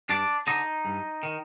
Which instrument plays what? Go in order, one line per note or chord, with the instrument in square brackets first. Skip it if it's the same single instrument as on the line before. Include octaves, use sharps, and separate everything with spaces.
[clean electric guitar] G2 D4 D5
D3 D#4 D#5
G2
D#3